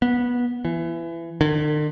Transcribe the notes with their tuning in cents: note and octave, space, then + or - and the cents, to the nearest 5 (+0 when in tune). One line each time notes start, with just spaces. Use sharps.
B3 -15
E3 +25
D3 +45